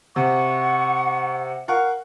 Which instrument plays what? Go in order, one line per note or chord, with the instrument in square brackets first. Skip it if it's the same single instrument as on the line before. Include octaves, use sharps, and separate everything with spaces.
[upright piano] C3 [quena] F#5 [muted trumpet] C#6
[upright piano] A#4 F#5 C#6 [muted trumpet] F5